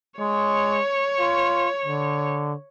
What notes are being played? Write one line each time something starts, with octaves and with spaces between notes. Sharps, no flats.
G#3 C#5
F4
D3